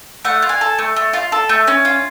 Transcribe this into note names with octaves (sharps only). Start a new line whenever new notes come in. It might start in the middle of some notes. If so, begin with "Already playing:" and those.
A3 F#5
F4
G#5
A4
A3
A3
F4
A4
A3
C#4
F4